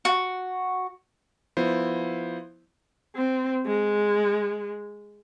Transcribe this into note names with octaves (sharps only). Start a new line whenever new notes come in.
F#4
F3 B3 E4 C5
C4
G#3